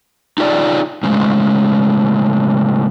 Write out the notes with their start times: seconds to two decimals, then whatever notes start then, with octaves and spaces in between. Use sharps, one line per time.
0.38 D#4 F4 G4 G#4 C#5 D5
1.03 A2 C#3 G#3